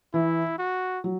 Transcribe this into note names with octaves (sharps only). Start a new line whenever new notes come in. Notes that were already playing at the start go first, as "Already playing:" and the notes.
E3 E4
F#4
F#3